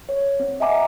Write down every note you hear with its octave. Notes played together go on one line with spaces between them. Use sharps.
C#5
C4
D#5 E5 F#5 G#5 A#5 D6